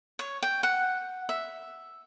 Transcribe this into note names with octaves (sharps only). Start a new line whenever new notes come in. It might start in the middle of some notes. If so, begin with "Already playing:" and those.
C#5
G5
F#5
E5